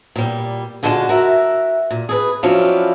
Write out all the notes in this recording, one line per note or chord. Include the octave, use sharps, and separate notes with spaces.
A#2 G3
A#2 D3 G#3 F#4 G4 A5
F#4 A#4 E5
A#2
G#4 A4 B4
F3 F#3 C#4 D4 E4 F4